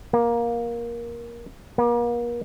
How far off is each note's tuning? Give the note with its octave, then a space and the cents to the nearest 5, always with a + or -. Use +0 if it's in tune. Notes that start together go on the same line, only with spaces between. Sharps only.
A#3 +15
A#3 +40